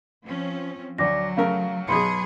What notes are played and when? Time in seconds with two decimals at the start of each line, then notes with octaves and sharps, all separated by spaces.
0.24 F3 C4 C#4
0.98 D2 F#3 D5 D6 A#6
1.37 C#3 A3 A#4 F5
1.88 B1 B2 F#3 G#4 B5 C6 C#7